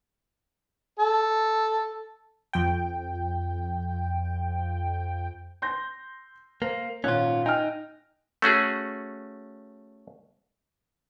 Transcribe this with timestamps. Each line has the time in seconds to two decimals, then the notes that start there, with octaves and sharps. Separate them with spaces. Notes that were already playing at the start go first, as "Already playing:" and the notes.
0.99 A4
2.53 F2 G5
5.62 C6 G6 A#6
6.62 A#3 C5
7.04 G#1 A#2 C#4 F4 F#6
7.46 D#4 G5 G#5 F6
8.42 A3 C#4 F#4 G#4